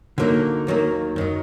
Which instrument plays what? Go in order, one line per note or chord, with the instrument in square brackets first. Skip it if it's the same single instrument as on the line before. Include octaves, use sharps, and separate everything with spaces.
[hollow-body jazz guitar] D3 F#3 A#3 D#4
D#2 D#3 F#3 A#3
F#2 D#3 F#3